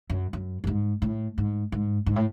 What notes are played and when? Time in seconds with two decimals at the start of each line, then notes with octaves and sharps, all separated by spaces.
0.10 F#2
0.33 F#2
0.64 G2
0.67 G#2
1.02 A2
1.38 G#2
1.72 G#2
2.06 G#2
2.16 A2